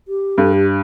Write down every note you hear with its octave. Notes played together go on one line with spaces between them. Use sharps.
G4
G2 A4
G4